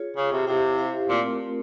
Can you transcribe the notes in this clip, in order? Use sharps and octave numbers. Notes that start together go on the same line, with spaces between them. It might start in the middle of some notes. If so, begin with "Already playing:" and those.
Already playing: F4 G#4 C#5
C#3 F4 G#4 C#5
C3
C3 E4 G4 C5 F5
E4 G4 C5 F5
A#2 A3 C4 F4 A#4